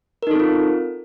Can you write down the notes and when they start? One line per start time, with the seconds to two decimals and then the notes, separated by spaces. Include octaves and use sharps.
0.23 A#4
0.27 D#4
0.31 A4
0.35 C4
0.40 F4